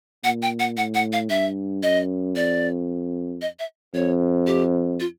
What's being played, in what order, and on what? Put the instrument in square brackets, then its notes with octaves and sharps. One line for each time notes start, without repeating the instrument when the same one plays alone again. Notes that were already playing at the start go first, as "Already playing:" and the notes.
[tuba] A#2 [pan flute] F#5
[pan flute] G5
F#5
[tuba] A2 [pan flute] F#5
[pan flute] F#5
F5
[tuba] G2 [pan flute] E5
[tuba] F#2 [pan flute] D#5
[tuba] F2 [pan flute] D5
[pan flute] D#5
E5
[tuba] F2 [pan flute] C#5
[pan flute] G4
F4